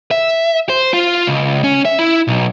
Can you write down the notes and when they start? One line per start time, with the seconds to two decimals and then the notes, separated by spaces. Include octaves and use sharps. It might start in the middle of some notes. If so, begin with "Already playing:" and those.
0.11 E5
0.69 C5
0.93 F4
1.27 C#2
1.64 C#4
1.85 E5
1.99 E4
2.28 B1